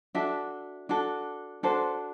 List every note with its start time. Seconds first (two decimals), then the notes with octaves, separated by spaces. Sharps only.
0.15 D4 F#4 A4 E5
0.89 D4 F#4 A4
1.63 D4 F#4 A4 C5